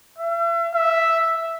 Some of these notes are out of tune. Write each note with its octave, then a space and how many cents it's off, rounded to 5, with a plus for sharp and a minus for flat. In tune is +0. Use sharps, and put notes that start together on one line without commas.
E5 +40
E5 +0